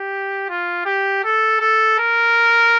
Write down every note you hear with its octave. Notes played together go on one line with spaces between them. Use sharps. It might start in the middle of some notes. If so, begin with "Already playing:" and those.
Already playing: G4
F4
G4
A4
A4
A#4